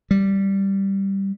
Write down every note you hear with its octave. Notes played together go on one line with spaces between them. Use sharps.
G3